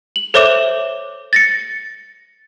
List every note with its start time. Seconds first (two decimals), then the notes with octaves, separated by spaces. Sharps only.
0.16 F#7
0.34 A4 C5 C#5 E5 D6 E7
1.33 A6 A#6 C#7